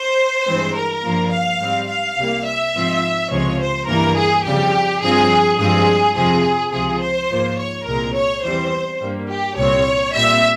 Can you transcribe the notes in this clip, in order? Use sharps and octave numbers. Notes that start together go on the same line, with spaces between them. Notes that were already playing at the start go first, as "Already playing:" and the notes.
Already playing: C5
G2 E3 G#3 C4
A#4
G2 F3 A#3
F5
G#2 G3 C4
F5
C2 C3 G3 A#3
E5
G#2 F3 C4
C#2 C3 F3 G#3 C#5
C5
G2 E3 A#3 A#4
G#4
F2 C#3 G3 G4
G2 F3 C4 G#4
G2 F3 G#3 C4 G#4
F2 C3 F3 C4 G#4
C#2 C3 F3 G#4
C5
G#2 F3 A#3
C#5
C2 A#2 G#3 C4 A#4
C#5
E2 E3 G3 C4 C5
G2 G3 A#3
G4
C2 A#2 G3 C4 C#5
A#2 G3 C4 E5